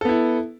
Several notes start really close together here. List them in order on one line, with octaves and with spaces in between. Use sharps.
A4 B3 E4